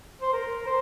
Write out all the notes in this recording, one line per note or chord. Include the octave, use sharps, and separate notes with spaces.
C5
A#4
C5